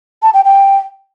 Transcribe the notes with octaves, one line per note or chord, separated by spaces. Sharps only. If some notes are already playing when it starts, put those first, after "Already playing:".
A5
G5
G5